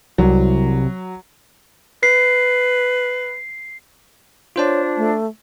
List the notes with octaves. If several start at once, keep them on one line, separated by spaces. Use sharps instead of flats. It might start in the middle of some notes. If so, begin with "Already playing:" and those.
C2 F#3
B4 C7
D4 F4 C5 C#5 A5
A3